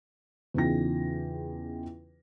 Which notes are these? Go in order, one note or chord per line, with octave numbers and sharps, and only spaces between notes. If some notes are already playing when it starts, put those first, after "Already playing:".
E2 C#3 D#4 F4 G5 A#6